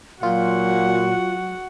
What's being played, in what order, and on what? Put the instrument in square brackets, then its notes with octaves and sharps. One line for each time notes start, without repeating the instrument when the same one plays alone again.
[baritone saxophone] A#2 [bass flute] F#3 [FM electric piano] F4 [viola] F#4 F#5